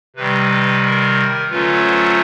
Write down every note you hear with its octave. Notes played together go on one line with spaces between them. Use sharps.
C3 D#3 G3 B4
B4
A#4
D3 F#3 A3 C#4 F4 B4
C5